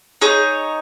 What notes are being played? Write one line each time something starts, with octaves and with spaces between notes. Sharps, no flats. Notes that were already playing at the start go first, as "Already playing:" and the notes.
D#4 G#4 C#5